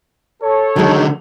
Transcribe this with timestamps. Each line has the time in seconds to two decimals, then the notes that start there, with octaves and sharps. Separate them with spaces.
0.43 A4 C#5
0.76 D3 D#3 F#3 G#3